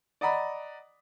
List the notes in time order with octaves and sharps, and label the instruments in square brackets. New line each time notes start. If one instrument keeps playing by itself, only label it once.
[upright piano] D5 D#5 F#5 A#5 B5